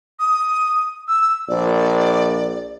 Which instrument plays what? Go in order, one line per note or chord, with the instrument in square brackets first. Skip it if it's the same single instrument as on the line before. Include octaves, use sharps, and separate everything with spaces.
[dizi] D#6
E6
[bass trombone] A#1 [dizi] D5